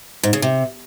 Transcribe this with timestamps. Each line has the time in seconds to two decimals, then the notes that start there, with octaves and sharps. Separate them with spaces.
0.23 G#2
0.33 C#3
0.42 C3